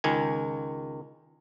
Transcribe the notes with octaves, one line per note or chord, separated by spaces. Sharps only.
C#2 D#3 G#5